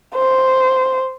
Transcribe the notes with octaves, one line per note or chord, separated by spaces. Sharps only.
C5